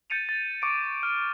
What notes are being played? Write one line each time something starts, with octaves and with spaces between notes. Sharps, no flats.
G6 A6 C#7 D#7 F7
A6
C#6 D6 C#7 D7
F6